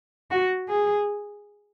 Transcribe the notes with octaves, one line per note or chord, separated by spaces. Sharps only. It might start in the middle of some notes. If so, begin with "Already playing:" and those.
F#4
G#4